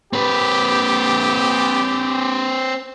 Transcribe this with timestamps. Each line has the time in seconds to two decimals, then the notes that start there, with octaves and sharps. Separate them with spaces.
0.13 C4 G4 B4